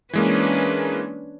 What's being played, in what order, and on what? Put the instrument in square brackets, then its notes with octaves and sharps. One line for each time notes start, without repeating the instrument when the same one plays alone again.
[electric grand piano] E3 G#3 A#3 [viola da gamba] C#4 D4 B4